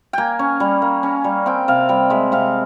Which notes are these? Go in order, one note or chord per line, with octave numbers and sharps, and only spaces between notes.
A#3 G5 G#5
C#4
G3
A#3
C#4
G3
C4 G5
C3 F5
G3 G5
G#3 E5
C3 F5